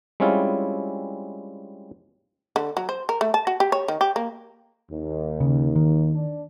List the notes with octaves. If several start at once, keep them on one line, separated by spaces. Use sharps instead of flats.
G3 G#3 C4 C#4 E4 F4
D3
F#3
C5
A#4
A3
A5
F#4
G4
C#5
D#3
G4
A#3
D#2
C#3
D#3
D4